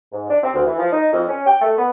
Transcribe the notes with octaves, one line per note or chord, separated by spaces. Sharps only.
G#2
D4
C4
D2
E3
F3
D#4
F2
C#4
G5
A3
B3